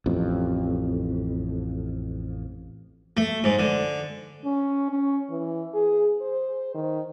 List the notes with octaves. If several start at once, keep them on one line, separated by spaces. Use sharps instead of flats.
A1 F2
A3
G#2
D3
C#4
C#4
E3
G#4
C5
D#3